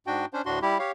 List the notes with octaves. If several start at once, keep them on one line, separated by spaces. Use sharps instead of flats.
G#2 D4 F#4 G5
C#4 D4 C5
D2 A2 D4 F#4 C6
G3 E4 G4
G4 C#5 F5